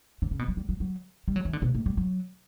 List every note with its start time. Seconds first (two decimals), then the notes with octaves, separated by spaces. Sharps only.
0.22 D3
0.31 C#3
0.39 B2
0.48 F#3
0.57 G3
0.69 F#3
0.80 F#3
1.28 G3
1.36 F#3
1.45 E3
1.53 D3
1.62 B2
1.75 A2
1.86 G3
1.97 F#3